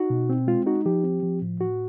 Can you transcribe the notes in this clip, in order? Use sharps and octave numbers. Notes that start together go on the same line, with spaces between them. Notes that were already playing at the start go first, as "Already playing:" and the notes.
Already playing: D#4 F#4
B2
C4
G#3 F4
D#4 F#4
F3 G4
C4
F3
A2
A2 F#4